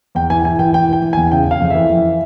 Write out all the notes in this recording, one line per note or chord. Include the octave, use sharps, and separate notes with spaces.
E2 G5
E3 G#5
E3 G#5
E3 G5
E3 G5
E3 G5
E3
E2 G#5
C#3 G5
C#3 F5
F2
E3 E5
E3